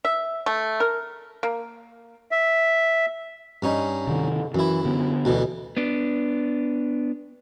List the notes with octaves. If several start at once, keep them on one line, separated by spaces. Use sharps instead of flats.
E5
A3
A#4
A#3
E5
G2 C#4 D#4
C3 D#3
F#2 E3 E4
D3 B3
D2 B2 E3
B3 D4